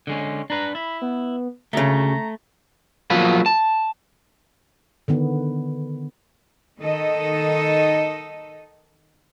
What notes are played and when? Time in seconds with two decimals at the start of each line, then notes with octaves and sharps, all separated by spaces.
0.07 D3 G#3 C#4
0.50 D4 B4 A#5
0.75 E4 B5
1.02 B3
1.73 D2 C#3 A3 A#5
3.10 F3 F#3 A#3 B3 B4
3.46 A5
5.08 D3 D#3 B3
6.80 D#3 D#4 A4 D#5